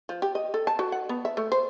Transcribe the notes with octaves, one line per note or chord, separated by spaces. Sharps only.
F3
G4
D#5
A4
A5
F#4
F#5
B3
E5
A3
C5